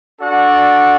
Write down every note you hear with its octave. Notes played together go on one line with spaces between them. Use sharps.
D4 F#4 A4 D5 F#5